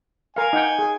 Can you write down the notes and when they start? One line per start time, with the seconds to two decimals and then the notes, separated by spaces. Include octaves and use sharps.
0.36 A#4 F5 G#5
0.53 D#4 F#5 G5
0.79 G#4